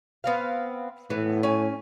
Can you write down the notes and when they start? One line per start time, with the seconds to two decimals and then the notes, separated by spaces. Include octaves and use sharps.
0.24 B3 C4 F5
1.10 A2 E3 B3
1.43 C#4 G#5